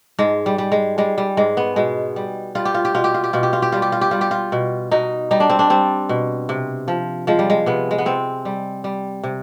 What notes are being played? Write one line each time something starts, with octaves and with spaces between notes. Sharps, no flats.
G#2 G#3
G3
G3
G#3
G3 G#3
G3
G#2 G#3
B3
B2 G#3
G3
G3 F4
G4
F4
G4
B2 F4
G4
F4
G4
B2 F4
G4
F4
G4
G3 F4
G4
F4
G4
G3 F4
G4
F4
B2
B2 D#4
G3 D#4
D4
C4
D4
G3 C4
B2
C3
F3
F3 G#3
G3
G#3
C3 B3
G#3
B3
C3 C4
G3
G3
C3